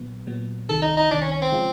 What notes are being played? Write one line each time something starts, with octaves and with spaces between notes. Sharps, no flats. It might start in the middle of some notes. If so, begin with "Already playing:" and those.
Already playing: A#2 F#3 B3
A#2 F#3 B3
C2 C3 D#3 A4
D#4
D#4
C2 C3 D#3 D4
C#4
C#4
C4
C#3 F3 G#3 C#4 F4